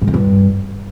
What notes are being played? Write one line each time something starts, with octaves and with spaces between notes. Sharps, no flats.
G#2
F2
G2